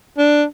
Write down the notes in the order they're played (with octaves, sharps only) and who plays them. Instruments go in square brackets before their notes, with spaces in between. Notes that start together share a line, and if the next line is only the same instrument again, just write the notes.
[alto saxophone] D4